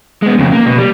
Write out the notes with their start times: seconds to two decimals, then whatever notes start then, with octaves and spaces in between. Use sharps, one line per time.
0.22 G#3 B3
0.39 F2 C#3
0.52 A#3
0.66 B2
0.78 G3